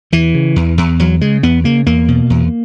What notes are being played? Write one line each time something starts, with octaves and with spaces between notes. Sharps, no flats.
E2 E3
C#3
E2
E2
E2 F#3
C#3 G#3
E2 B3
C#3 A#3
E2 A#3
B2
E2